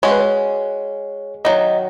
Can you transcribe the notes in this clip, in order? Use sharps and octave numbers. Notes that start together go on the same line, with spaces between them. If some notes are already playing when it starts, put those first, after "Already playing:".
G#3 C#4 F#4 C#5
B4
C#5
D#3 F#3 D#5